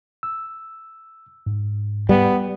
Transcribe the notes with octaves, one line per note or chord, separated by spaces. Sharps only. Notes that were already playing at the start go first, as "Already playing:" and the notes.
E6
G#2
G3 B3